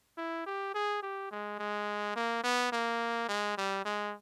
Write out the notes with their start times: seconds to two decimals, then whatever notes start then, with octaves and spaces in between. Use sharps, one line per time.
0.18 E4
0.46 G4
0.74 G#4
1.03 G4
1.31 G#3
1.59 G#3
2.16 A#3
2.44 B3
2.72 A#3
3.29 G#3
3.58 G3
3.85 G#3